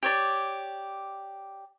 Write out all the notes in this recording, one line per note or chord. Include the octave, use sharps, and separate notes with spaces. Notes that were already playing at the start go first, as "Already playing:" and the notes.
G4 C#5 D5